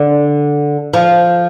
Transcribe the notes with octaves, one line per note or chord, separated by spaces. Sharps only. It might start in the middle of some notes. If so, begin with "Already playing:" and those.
Already playing: D3
F3